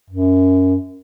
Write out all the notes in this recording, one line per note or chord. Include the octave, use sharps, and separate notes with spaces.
F#2